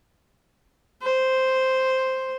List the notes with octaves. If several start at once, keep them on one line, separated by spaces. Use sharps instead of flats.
C5